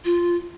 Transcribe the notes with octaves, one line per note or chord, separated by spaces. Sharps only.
F4